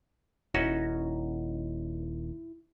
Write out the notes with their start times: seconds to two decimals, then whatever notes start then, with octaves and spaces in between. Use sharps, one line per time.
0.54 D#1 C#4 D#4 E4 F#4